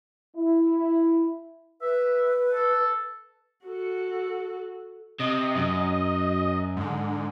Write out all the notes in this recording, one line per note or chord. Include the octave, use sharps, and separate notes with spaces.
E4
B4 E5
A4
F#4 A4
C3 D#5
F#2
G#2 D3